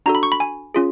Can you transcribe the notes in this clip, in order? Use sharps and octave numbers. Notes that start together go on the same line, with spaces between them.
D4 F#4 A4 A#5
B5
C#6
B5
G#5
C#4 F4 G#4